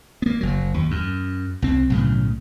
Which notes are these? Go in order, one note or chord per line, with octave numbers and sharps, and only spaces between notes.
A#3 B3
F#1 F#3
D#2
F#2
C2 C4
B1 A2 C#3